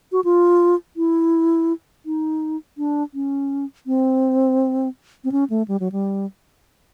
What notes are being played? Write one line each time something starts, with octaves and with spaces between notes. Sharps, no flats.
F#4
F4
E4
D#4
D4
C#4
C4
C4
C#4
A3
G3
F#3
G3